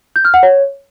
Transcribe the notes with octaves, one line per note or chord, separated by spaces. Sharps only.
G6
F6
F#5
C#5